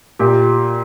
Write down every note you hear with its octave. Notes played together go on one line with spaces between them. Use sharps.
A#2 G4